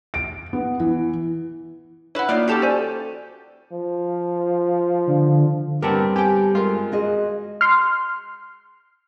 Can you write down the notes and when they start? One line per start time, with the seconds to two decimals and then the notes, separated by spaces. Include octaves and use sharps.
0.14 D7
0.53 B3
0.80 E3
2.15 E4 B4 C#5 F#5
2.29 A#3 D#4 F4 D5 F6
2.48 C#4 F#4 G4 A4 A5 D6
2.62 C5 D5 G#5
3.72 F3
5.07 D3
5.82 G2 B3 C4 G4 A#4 A5
6.16 G4 A4 G5 G#5
6.55 G#3 F4 A#4
6.92 F#4 G#4 D#5
7.61 C6 F6